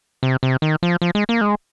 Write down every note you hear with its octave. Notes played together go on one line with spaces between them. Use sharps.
C3
C3
D#3
F3
F3
G#3
A#3
G#3